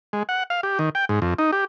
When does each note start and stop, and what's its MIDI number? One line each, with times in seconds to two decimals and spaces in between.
0.13 0.23 56
0.29 0.43 78
0.50 0.61 77
0.63 0.78 67
0.79 0.89 51
0.95 1.05 79
1.09 1.20 44
1.22 1.34 41
1.39 1.51 63
1.53 1.65 67